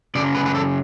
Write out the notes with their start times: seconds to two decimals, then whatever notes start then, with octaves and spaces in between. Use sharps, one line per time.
0.15 F#2 C#3 F#3 D5
0.35 B4
0.46 B4
0.55 A4